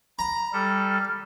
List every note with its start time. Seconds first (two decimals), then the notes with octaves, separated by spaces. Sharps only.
0.19 A#5 B5
0.53 G3 A4 F6